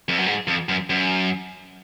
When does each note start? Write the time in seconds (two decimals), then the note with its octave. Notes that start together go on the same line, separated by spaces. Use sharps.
0.09 F2
0.18 F#2
0.26 G#2
0.48 F2
0.69 F#2
0.90 F#2